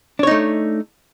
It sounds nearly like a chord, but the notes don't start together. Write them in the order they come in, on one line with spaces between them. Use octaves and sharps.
D4 C#5 D#4 A3